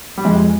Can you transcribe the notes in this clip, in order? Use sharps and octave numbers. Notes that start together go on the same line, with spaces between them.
G3
F2 G#3